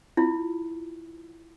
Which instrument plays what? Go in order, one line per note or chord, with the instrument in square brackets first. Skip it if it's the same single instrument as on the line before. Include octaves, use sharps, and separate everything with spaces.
[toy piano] E4 F4